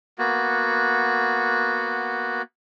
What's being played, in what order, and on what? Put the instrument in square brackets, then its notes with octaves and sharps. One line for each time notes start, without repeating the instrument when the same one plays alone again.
[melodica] A#3 B3 F#4